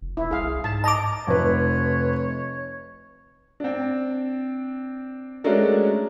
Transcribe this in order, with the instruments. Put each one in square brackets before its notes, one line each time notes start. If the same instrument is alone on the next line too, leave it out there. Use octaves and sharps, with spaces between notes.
[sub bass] F1
[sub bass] E1 [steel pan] E4
[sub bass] C2 [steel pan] G#4 F5
[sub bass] G#2 [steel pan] A5
[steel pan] D#5 A#5 [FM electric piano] A5 D6
[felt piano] F1 B4 [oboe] C#5
[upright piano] C4 D4
G#3 A3 C#4 D4 F#4 A#4